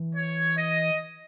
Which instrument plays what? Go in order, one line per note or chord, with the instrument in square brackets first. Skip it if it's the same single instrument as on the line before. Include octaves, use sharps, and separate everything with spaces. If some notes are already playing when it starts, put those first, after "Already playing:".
Already playing: [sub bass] E3
[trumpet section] C#5
D#5